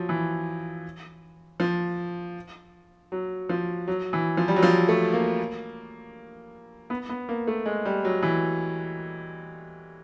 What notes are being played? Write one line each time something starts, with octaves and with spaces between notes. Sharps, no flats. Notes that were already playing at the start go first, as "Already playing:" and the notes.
Already playing: F3 F#3
E3
F3
F#3
F3
F#3
E3
F3
G3
F#3
F3
A3
A#3
B3
B3
A#3
A3
G#3
G3
F#3
E3